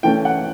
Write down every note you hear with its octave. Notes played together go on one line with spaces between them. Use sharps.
E3 A3 C#4 G5
F#5